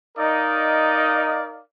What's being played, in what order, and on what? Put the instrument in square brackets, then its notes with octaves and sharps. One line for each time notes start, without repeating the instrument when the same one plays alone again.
[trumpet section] D#4 A#4 D5 D#5 F5